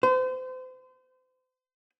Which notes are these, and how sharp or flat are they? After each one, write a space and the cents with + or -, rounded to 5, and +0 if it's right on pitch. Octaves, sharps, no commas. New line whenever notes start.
C5 -35